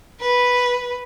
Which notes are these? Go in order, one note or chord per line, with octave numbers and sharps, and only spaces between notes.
B4